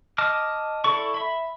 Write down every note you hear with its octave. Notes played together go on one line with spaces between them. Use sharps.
D#5 A5 D6 F6
E4 A4 D5 C#6
E5 B5